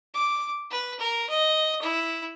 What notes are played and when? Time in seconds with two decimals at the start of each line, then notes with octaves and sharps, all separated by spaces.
0.14 D6
0.70 B4
0.99 A#4
1.29 D#5
1.82 E4